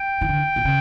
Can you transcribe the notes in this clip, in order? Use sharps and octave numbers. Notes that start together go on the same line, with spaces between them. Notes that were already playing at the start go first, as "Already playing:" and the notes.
Already playing: G5
E3
D3
A#2
C#3